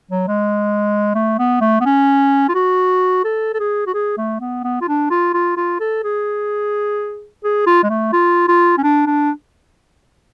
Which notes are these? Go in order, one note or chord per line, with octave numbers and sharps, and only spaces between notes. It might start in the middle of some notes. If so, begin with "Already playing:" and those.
F#3
G#3
A3
B3
A3
B3
C#4
F4
F#4
A4
A4
G#4
F#4
G#4
A3
B3
B3
F4
D4
F4
F4
F4
A4
G#4
G#4
F4
G#3
A3
F4
F4
C#4
D4
D4